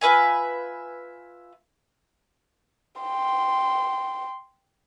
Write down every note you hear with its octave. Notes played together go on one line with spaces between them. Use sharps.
F4 B4 E5 G#5
G5 C6